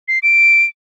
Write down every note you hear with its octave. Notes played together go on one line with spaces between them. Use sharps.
C7
D7